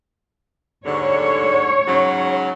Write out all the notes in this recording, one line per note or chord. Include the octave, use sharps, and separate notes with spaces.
D#2 G#2 D3 C#5
G#2 C#3 F#3